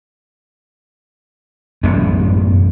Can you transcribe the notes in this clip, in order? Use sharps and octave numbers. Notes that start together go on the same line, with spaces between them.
A1 F#2 B2 B3